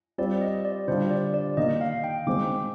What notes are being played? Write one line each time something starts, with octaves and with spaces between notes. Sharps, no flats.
G3 C4 F4 D5
D#5
D5
D3 G3 D4 F4 C5
D5
D5
D#3 A#3 D#4 D#5
F5
G5
D#3 G#3 C4 D6